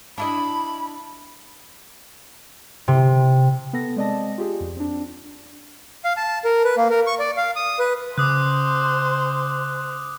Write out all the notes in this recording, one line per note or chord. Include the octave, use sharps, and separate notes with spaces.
D4 E4 D#5 B5
C3
B3 A4 A#6
G#3 C4 D5 D#5 A5 A#6
F4 G4 G#4
F2
C4 D4
F5
A5
A#4
B4
A#3
A#4
C#6
D5
F5
D#6
B4
C#3 C5 D6 D#6 F#6